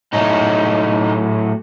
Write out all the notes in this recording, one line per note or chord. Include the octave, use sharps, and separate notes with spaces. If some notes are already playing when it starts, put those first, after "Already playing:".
A2 F#3 A3 D#4